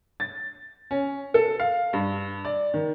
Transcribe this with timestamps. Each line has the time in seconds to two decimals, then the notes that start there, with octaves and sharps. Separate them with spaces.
0.20 A6
0.91 C#4
1.34 A4
1.60 F5
1.93 G2
2.45 D5
2.74 D#3